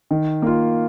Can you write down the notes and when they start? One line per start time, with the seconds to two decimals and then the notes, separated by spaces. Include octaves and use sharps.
0.11 D#3
0.42 A#3 F4